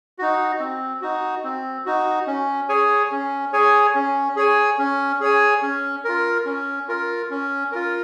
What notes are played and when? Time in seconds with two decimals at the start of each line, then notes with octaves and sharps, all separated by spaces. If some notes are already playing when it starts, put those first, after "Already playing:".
0.19 D#4 F#4
0.60 C4
1.02 D#4 F#4
1.44 C4
1.86 D#4 F#4
2.27 C#4
2.69 G#4 C#5 G#5
3.12 C#4
3.53 G#4 C#5 G#5
3.95 C#4
4.36 G#4 C#5 G#5
4.79 C#4
5.20 G#4 C#5 G#5
5.62 C#4
6.04 F4 A#4
6.46 C#4
6.88 F4 A#4
7.30 C#4
7.72 F4 A#4